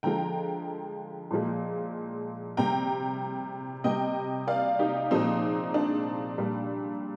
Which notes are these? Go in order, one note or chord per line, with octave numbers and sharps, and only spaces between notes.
D3 F3 G#3 G5 A#5
A#2 F3 G#3
C3 G3 G5 A#5
C3 G3 D#5 G5
D5 F5
D#4 G4
A#2 F3 G#3 C4 D#4
D4
A#2 G3